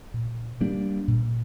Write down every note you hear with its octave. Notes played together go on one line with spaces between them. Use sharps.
A#2
G3 A#3 D4
A#2